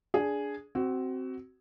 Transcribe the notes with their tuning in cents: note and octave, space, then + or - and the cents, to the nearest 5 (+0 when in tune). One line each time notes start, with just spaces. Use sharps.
D4 -15 G#4 +0
C4 +0 F#4 +20